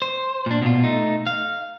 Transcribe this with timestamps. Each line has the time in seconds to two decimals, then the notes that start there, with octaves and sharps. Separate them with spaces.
0.02 C5
0.46 A#2 D4
0.62 B2 F4
0.84 A3 D#4
1.27 F5